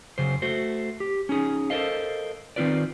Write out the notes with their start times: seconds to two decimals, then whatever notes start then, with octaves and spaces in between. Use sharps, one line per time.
0.18 F#2 C#3 C5
0.42 A3 F#4 C5
1.00 G4
1.29 C#4 D#4 G#4
1.70 A4 A#4 C5 D#5 F5
2.56 D#3 C4 D#4 F4 B4 D5